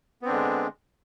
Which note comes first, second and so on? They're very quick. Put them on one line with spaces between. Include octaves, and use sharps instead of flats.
B3 C4 D4 D3 G#3